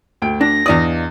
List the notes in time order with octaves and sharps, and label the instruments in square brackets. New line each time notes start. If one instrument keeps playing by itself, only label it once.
[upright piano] D2 G5 D7
[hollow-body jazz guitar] D4 [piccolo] A#6
[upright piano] E2 D4 D#6 [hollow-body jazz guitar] D5 D#5 F5